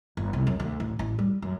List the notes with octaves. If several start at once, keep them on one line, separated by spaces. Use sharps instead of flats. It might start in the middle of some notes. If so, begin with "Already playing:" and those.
G1
C2
F#2
D2
A1
A1
G3
F#2